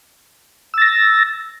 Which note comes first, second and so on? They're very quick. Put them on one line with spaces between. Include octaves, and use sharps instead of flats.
E6 A6 A#6